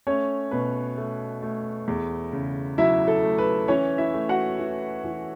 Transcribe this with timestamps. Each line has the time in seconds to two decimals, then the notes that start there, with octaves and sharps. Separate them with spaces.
0.07 A3 C#4 C#5
0.51 B2 B4
0.97 A3
1.42 A3
1.88 E2
2.33 C#3
2.78 F#3 E4 E5
3.08 A4
3.23 A3
3.38 B4
3.68 E3 C#4 C#5
3.98 E4 E5
4.14 A3
4.29 F#4 F#5
4.59 E3
5.04 E3